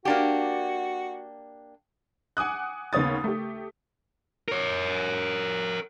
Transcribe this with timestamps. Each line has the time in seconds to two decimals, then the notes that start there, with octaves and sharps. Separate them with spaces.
0.05 A#3 D4 F#4 G4
2.37 F#5 G#5 D6 D#6 F#6
2.93 D#2 C#3 B3 C#5 D#6 A6
3.24 A3 G4
4.48 A#4 C#5